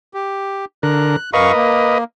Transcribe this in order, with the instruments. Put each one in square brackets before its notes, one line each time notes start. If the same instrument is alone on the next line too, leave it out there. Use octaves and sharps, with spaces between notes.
[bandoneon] G4
[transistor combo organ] D3 A#4 [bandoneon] F#6
[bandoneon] F#2 F5 C#6 [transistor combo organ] A#4 B4 D#5
[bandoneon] A#3